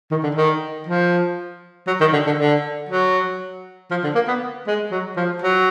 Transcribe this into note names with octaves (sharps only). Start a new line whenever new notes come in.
D#3
D3
D#3
F3
F#3
D#3
D3
D3
D3
F#3
F3
D3
A#3
B3
G#3
F#3
F3
F#3